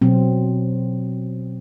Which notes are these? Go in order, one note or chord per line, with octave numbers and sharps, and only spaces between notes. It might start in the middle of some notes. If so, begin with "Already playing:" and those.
B2 F#3 C4